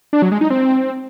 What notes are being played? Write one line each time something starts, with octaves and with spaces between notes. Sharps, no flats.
D4
F#3
G#3
D#4
C4